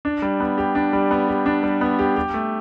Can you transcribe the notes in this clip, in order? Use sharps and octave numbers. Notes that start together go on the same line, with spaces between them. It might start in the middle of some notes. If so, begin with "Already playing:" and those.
D4
G3
B3
G4
D4
G3
B3
G4
D4
G3
B3
G4
G4
A3